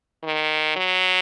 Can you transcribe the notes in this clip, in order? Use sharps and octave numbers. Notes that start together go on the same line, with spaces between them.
D#3
F#3